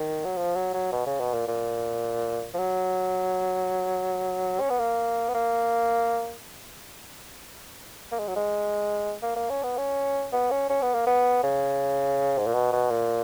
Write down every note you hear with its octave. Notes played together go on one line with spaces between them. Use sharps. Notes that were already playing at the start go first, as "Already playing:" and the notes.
Already playing: D#3
F#3
F3
F#3
F#3
B2
C#3
B2
A#2
A#2
F3
F#3
C#4
B3
A#3
B3
A#3
A#3
G#3
F#3
G#3
A#3
A#3
C#4
B3
C#4
B3
C#4
C#4
B3
A#3
B3
C#3
G#2
A#2
B2
B2
A#2